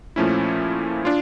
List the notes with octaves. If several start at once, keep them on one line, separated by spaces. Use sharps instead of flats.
A#2 F3 A3 C#4 E4
D4 F4